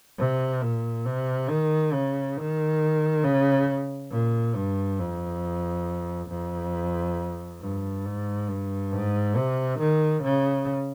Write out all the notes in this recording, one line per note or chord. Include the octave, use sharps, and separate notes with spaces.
C3
A#2
C3
D#3
C#3
D#3
C#3
A#2
G2
F2
F2
G2
G#2
G2
G#2
C3
D#3
C#3